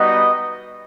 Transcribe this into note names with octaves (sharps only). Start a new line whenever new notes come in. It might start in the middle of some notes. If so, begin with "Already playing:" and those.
Already playing: G3 B3 D#4 F#4 D#5